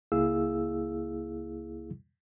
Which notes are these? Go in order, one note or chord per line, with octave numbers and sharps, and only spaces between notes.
C#2 A#3 E4 G#4 F5 E6